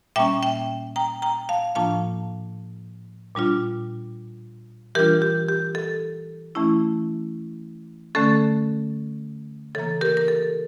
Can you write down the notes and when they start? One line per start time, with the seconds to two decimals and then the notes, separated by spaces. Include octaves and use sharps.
0.16 A#2 G3 A#3 C#4 E5 G5
0.43 E5 G5
0.96 G5 A#5
1.22 G5 A#5
1.49 F5 A5
1.75 A2 F3 A#3 D4 F4 F5 A5
3.35 A#2 G3 D4 F4
4.95 E3 G3 D4 F4 G4 A#4
5.22 G4
5.49 G4
5.75 A4
6.55 E3 A3 C#4 E4
8.15 D3 A3 C#4 A4
9.75 C#3 E3 A#3 A4
10.01 G4 A#4
10.17 A#4
10.28 A4